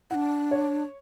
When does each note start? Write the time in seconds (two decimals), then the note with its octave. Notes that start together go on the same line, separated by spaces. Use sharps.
0.10 D4 E4 F#5
0.51 C#5